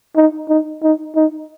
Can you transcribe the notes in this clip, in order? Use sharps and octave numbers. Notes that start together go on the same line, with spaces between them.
D#4
D#4
D#4
D#4